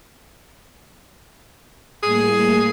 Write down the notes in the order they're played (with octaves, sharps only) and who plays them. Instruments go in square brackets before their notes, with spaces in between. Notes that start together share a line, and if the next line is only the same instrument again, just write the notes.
[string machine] A2 G3 A#3 [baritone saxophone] G#4